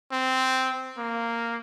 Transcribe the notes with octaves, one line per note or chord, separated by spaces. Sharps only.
C4
A#3